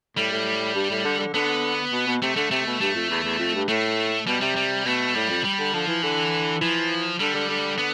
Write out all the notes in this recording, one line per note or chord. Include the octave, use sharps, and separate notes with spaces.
A2 G3
A2
G2
A2
D3
D3
D3 B3
B2
B2
C3 A3
D3 A3
C3 A3
B2
G2 A3
F2
E2
E2
F2
G2
A2 A3
B2 G3
C3 G3
G3
B2 A3
A2 G3
F2
G3
D3
D3 F3
E3
D3 E3
E3 F3
D3 G3
D3
D3
B3